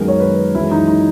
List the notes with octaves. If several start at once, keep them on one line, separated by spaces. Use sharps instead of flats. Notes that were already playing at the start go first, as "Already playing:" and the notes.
Already playing: F#2 D#3 G#3 B3 D#4 A#4
C#5
B4
F#2 E3 G#3 C#4 E4
D#4
D#4